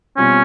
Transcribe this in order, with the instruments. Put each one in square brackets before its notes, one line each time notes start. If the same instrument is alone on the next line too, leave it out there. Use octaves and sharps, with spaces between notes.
[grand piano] B2 G3 C4 F4 [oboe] C#4